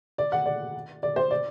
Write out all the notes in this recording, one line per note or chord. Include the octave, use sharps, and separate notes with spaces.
D5
F#5
D5
D5
C5
D5